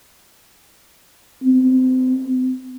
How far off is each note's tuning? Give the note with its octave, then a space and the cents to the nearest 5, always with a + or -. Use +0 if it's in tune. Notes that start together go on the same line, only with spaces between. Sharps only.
C4 -25